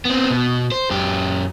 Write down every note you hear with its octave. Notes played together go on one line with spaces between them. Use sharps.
B3 C4
B2
C5
F#2 G4